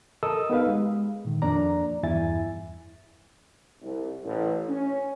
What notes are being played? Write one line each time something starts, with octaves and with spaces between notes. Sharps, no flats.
A4 A#4 D#5 D#6 E6
B3 D#4 G4 B4 F5
G#3
A#2 D#3
F2 A#3 D4 D5 A#5
E2 G2 E4 E5 G#5 A6
C2
A1
C#4